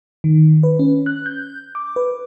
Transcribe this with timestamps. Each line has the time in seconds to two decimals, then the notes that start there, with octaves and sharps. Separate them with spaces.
0.24 D#3
0.63 B4
0.79 C#4
1.06 F#6
1.26 G6
1.75 D6
1.96 B4